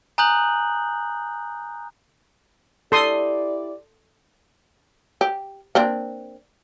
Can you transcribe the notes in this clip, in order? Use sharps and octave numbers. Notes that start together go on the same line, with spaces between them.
G#5 A#5 D#6 F#6 G6 F#7
E4 G4 A4 D5 C6 D#6
G4
A#3 C4 D4